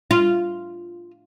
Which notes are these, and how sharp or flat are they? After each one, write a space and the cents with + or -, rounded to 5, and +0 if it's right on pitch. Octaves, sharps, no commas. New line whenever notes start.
F4 -5